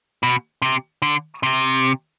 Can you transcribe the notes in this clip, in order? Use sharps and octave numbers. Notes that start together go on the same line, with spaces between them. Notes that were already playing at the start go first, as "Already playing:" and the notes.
B2
C3
D3
C3